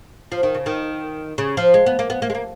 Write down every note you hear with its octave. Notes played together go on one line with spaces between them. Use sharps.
F3
D#3
C#3
D#3
C#3
F3
G#3
B3
A#3
B3
A#3
G#3
A#3